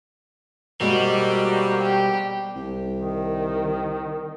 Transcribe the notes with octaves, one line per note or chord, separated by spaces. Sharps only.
B2 G3 G#3 A#3 C4 F#4
G4
C2
D#3